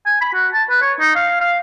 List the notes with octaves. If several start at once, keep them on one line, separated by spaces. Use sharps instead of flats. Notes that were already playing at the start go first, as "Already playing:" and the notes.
G#5
B5
F#4
A5
B4
C#5
D#4
F5
F5